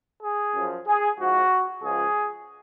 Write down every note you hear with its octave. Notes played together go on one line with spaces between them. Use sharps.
G#4
F#2 F3
G#4
G#2 F3 F#4
C#2 C#3 F3 G#4